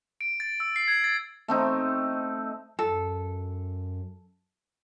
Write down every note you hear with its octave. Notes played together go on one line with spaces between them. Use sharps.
D7
A6
E6
C7
G#6
A6
A3 C4 D#4
F#2 A4